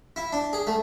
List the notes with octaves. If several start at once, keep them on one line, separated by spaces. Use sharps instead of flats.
E4
D4
G#4
A3